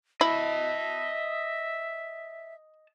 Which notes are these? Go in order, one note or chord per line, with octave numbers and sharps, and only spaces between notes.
E4 D#5 E5 A5